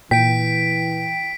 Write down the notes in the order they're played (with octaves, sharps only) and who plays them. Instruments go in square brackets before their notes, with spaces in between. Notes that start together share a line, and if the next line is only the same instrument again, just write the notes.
[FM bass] A#2 [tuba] E3 [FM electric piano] G5 [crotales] B6 D7